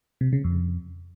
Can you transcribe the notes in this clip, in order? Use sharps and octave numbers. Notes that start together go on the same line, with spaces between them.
C3
C#3
F2